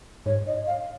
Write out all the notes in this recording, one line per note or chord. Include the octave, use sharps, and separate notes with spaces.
G#2 C#5
D#5
F5